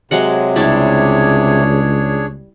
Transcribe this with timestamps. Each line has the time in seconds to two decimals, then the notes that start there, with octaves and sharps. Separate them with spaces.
0.11 C3 F#3 G#3 F#5
0.56 C#2 G3 D4 E4 G4 G#4 C#5